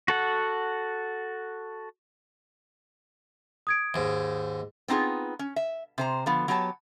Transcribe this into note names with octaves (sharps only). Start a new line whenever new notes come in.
F#4 A4 F#5
D#6 G#6 D7
D#2 G#2
B3 C4 D#4 F4 G#4
C#4
E5
C3 C5 A#5
D3 F3 B3
F#3 B3 G4 C#5 A5